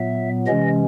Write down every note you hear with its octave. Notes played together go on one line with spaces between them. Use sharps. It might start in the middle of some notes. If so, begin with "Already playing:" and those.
Already playing: A#2 F#3 B3 E5
C3 E3 G#3 C#4 D#5